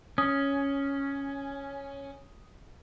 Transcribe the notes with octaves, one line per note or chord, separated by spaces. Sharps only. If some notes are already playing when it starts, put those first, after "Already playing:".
C#4 D#6